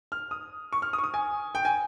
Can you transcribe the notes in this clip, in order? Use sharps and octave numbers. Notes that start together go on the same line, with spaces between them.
F6
D#6
C#6
F6
D#6
C#6
D#6
G#5
G5
G#5